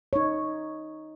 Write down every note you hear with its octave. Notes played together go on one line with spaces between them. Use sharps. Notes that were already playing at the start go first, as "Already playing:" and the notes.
D#4 C#5